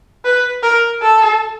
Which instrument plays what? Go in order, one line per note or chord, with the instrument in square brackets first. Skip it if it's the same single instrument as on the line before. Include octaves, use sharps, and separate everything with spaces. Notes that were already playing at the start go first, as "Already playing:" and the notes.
[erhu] B4
A#4
A4